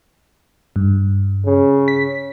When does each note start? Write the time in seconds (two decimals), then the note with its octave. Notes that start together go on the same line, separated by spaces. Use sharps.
0.76 G2
1.46 C#3
1.88 B6